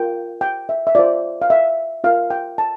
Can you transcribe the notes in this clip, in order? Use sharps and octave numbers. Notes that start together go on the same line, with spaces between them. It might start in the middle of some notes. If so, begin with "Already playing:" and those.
Already playing: F4 A#4 G5
G5
E5
E5
F4 C5 D5
F5
E5
F4 A#4 F5
G5
A5